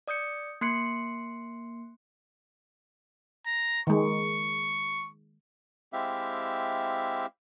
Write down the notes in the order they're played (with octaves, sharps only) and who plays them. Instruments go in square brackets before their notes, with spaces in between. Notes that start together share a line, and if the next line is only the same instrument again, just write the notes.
[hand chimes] D5 D#6 G6 C#7
A#3 C6 F#6 C7 C#7
[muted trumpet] A#5
[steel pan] D#3 G#3 [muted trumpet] C#6
[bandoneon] G#3 C4 E4 G4 E5 F5